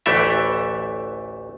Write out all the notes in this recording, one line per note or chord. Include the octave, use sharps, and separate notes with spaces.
A1 D2 E3 A3 G4 E5